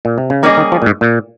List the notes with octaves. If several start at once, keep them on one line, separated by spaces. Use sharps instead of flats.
A#2
C3
C#3
D#3 G3 A#3 C#4 G#4 D#5
D#3
F3
A#2
G#2
A#2